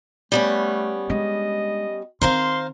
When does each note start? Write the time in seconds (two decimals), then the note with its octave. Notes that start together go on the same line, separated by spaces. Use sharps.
0.32 G3 A3 B3 C#4
1.10 G#3 D4 D#5
2.22 D#3 C4 A#4 C5 F5 C6